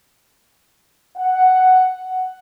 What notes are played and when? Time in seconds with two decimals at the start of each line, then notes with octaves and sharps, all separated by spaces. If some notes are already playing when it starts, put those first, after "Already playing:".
1.17 F#5